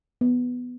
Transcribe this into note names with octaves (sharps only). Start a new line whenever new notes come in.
B3